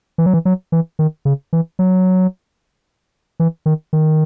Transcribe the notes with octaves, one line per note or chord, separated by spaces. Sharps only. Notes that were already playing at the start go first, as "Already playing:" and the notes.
E3
F#3
E3
F#3
E3
D#3
C#3
E3
F#3
E3
D#3
D#3